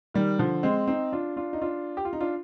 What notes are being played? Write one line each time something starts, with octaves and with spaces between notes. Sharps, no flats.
D#3 G3
D3 F3
G#3 C4
C4 D#4
D4 F4
D4 F4
D#4
D4 F4
G4
F4
D#4
D4 F4